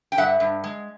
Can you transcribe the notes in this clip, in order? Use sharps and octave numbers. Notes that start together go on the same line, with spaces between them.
G5
G2 E5 F#5
G2
G#3